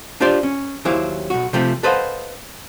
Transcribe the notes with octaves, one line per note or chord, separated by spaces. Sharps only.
D4 F4 G4 C5 D5
C#4
D#2 F#3 E4 G4 C5 F5
B1 F#4
C3 F3 A3 G4
A4 B4 C5 D#5 F5 F#5